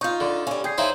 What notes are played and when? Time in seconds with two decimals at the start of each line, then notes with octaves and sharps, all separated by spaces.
0.01 D#4 F4 C#6 G6
0.20 D3
0.47 G3 C#4 F5 G#5
0.64 G#4 G5 G6 C7
0.78 D#4 E4 C5 C#5 F5 G#5